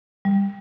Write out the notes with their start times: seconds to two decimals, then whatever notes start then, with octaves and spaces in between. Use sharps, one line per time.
0.25 G3